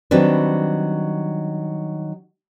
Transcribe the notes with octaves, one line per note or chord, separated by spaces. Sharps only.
D#3 F#3 G3 C4 D4 B4